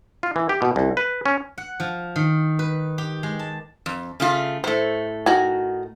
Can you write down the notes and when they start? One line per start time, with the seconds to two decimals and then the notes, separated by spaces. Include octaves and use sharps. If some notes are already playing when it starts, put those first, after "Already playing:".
0.23 F4
0.36 E3
0.49 G4
0.62 B2
0.76 C2
0.97 B4
1.26 C#4
1.58 F#5
1.80 F3
2.16 D#3
2.59 B4
2.98 G4
3.23 G#3
3.39 A5
3.86 F2
4.20 C#3 A3 F4
4.64 A2 A3 C5
5.26 D#3 F#4 G#5